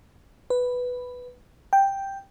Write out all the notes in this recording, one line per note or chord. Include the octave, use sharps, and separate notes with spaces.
B4
G5